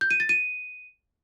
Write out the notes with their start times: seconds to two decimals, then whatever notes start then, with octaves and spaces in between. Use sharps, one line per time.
0.01 G6
0.11 D#7
0.20 A6
0.29 D#7